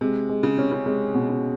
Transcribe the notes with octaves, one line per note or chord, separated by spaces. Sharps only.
C3 G#3
G#3
C#3
C3 C#4
C#3
C3 G#3
B2
C#3